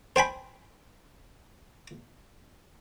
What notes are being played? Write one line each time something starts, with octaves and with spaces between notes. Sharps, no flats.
C5 G5 G#5 B5